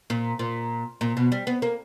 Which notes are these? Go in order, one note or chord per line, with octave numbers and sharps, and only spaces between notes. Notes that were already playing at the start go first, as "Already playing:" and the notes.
A#2
A#2
A#2
B2
G3
B3
A#3